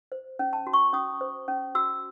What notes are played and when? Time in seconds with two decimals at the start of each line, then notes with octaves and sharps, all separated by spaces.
0.12 C5
0.39 C#4
0.53 A5
0.67 F#4
0.73 C#6
0.93 C#4 D#6
1.21 C5
1.48 C#4
1.75 F#4 E6